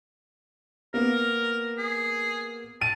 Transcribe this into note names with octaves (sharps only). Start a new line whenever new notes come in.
A#3 B3 A#4
G#4
A5 D#7